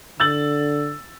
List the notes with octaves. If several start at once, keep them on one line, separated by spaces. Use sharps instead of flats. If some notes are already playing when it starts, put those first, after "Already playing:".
D3 E6 A6 F#7